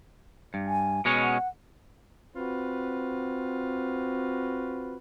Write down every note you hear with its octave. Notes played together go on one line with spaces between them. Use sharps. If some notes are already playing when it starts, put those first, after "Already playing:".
G2
G#5
B2 G#3 C#4
F#5
C4 F4 F#4 B4